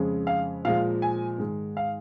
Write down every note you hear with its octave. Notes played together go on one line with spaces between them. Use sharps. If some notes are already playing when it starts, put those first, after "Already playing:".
Already playing: F2 C#3 G#3
F5
A#2 F3 G#3 F5
G#5
G#2 D#3 G#3
F5